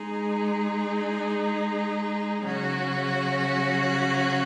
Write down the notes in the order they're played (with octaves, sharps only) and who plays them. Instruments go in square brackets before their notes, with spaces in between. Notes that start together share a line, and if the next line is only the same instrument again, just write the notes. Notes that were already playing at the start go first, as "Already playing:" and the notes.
Already playing: [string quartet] G#3 D#4 G#4
C#3 F#3 C#4 F#4